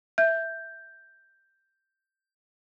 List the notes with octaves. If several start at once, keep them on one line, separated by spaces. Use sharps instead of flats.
E5 G6